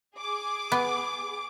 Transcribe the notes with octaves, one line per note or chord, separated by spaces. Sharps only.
G#4 D6
B3